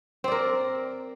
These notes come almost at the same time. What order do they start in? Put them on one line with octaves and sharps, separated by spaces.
C4 D5 A#4